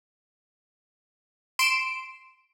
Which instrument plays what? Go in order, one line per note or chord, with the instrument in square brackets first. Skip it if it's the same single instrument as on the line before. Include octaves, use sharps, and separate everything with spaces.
[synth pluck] C6 D7 E7